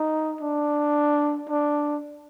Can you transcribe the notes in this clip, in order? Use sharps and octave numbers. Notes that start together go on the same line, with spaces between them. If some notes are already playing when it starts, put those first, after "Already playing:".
Already playing: D#4
D4
D4